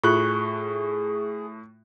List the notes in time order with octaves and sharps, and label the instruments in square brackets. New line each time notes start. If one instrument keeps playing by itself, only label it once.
[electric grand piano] A2 A3 F#6 [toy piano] F4 [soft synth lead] G#4 [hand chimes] C#6